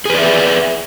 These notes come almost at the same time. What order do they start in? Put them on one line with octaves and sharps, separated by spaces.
G#4 B4 D5 E5